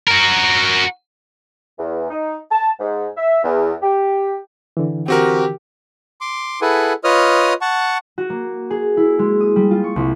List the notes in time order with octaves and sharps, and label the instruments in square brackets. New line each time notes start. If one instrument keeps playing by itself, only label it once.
[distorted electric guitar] F#4 A#4
[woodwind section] E2
D#4
A5
G#2
E5
E2
G4
[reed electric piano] D3 E3
[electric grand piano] C4 F#4 A#4 [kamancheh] G4
[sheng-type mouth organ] C6 D6
E4 G#4 A4 B4 F#5 G#5
F4 B4 C#5 D#5 D#6 F6
F#5 A5 C#6
[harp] F#4
A#3
G#4
E4
G#3
D#6
G3
F4
C#6
C2